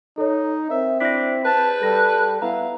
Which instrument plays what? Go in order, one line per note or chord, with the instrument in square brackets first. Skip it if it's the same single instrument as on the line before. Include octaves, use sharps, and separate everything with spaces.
[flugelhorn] D#4 [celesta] A4 C#5
[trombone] C4 [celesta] A#4 [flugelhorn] E5
[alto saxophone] D4 [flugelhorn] E4 [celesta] A#6 B6
[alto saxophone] B4 [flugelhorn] A5
[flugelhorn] G3 [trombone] A4 [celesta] B5 A#6
[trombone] B3 [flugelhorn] E4 [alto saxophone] F5 [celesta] A#5